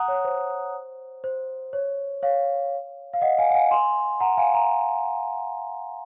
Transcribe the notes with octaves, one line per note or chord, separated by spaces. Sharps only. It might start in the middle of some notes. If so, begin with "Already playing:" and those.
Already playing: F#5 A#5 D#6 F#6
C#5
C5
C5
C#5
C#5 F5
F5
D#5 F#5
F5 G#5
F#5
F5 G#5
G#5 C6
F#5 A#5
F5 G#5
A#5